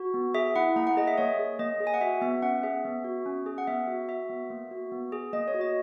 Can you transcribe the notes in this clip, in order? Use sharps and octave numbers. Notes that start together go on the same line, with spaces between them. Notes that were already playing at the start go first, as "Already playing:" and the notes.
Already playing: F#4
B3
G#4 E5
E4 F#5
A#3 A#5
F#5
G#4 D#5
E5
A#3 C#5
G#4
A#3 D#5
G#4
G#5
F#5
F#4 E5
B3 E5
C#4 F#5
G#4 E5
B3
F#4
C#4
G#4
F#5
B3 E5
F#4
F#4 E5
B3
A#3
F#4
B3
G#4
A#3 D#5
C#5
F#4
D#5